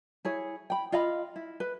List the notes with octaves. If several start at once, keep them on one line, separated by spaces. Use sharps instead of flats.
E4 G#4 C#5
G5 B5
F4 D#5 F5 B5
E4
B4